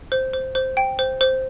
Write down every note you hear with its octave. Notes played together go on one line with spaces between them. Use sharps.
C5
C5
C5
G5
C5
C5